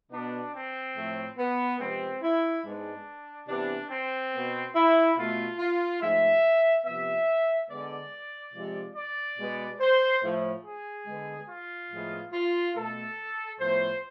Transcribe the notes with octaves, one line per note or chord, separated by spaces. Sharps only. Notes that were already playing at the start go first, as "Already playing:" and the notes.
B2 B3 D4
C4
A2 F3 A3
B3
C3 F3 G#3 B3 C4
E4
G#2 G#3 B3 D4
C3 E3 B3 D4
C4
B2 B3
E4
B2 A3 F4
F4
G#2 F3 A3 E5
C3 F3 B3 E5
D3 G#3 B3 D5
C3 F3 G#3
D5
B2 G#3 B3
C5
A2 F3 A3
G#4
D3 G#3 B3
F4
A2 F3 G#3 B3
F4
B2 A3 A4
A2 F3 B3 C5